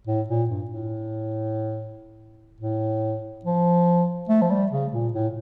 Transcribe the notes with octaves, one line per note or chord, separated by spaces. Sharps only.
A2
A#2
G2
A2
A2
F3
A3
F3
G3
C#3
A#2
A2